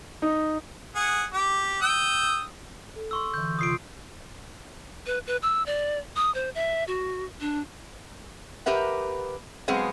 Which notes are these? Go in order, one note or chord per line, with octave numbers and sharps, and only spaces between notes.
D#4
G#4 F#5
G4
G5 D#6 E6
A4
C6 C#6 E6
D3 E3 G6
C3 F4 C6 D#6 C7 D7
B4
B4
E6
D5
D#6
C5
E5
F#4
D4
G4 A#4 B4 E5 F#5
F#3 G#3 B3 C4 G#4 F5